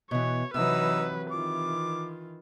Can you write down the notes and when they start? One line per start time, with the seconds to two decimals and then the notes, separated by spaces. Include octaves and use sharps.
0.11 B2 E3 C#5
0.54 C3 E3 F#3 D#4 B4 E6
1.31 D#3 E3 F4 D6